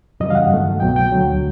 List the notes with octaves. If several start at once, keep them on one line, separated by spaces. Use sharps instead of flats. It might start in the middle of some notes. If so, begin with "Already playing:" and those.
F#2 C#3 E3 G3 D#5
F5
F#5
G2 D#3 F#3 A3
C2 B2 F#3 G5
G5
D2 D3 F#3 A3